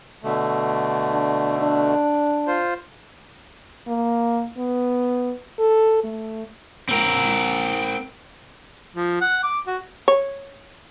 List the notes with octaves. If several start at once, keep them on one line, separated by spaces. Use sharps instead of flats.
B2 D3 A3
D4
D4
F4 C5
A#3
B3
A4
A3
C4 A#4
F3
F#5
D6
F#4
C#5